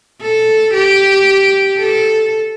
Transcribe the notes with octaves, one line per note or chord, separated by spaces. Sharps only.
A4
G4
A4